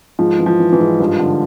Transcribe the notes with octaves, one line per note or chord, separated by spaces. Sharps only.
G#2 F3
E3
F3
E3
E3
G#2
G2 F3
D3